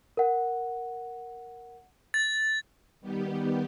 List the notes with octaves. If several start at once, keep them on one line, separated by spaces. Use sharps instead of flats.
A#4 F#5
A6
D#3 G3 B3 G4